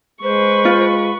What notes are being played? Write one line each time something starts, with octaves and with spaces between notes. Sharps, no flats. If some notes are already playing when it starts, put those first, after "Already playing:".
G#3 B4 C5 C#6
F4